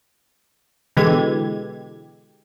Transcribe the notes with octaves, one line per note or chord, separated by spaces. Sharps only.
B2 D3 E3 G#3 G4 G#6